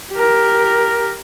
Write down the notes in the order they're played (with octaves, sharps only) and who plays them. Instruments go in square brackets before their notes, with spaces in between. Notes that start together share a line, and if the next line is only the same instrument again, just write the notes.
[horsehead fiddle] G4 A#4